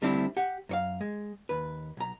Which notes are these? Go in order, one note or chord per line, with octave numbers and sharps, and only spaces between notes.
D3 G3 A3 C4 D4 E4
G4 F#5
F#2 C#5 F5
G#3
D#2 B4
B1 A#5